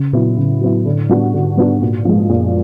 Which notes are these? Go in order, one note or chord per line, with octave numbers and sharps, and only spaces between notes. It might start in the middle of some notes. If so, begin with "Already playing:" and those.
Already playing: C#3
A#2 F#3 B3 E4
A2 C#3
F#3 B3 E4
D3
G3 B3 D4 F#4
G#2 D3
G3 B3 D4 F#4
A#2
F3 G#3
F#2 A#2